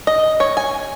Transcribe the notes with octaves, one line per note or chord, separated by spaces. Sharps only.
D#5
C#5
G#5